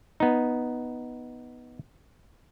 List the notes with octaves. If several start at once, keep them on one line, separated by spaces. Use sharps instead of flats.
B3 D#4